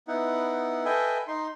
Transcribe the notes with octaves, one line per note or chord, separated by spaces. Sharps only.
B3 D#4 E4 F#5
A4 B4 D#5 E5 G5 G#5
D#4 C6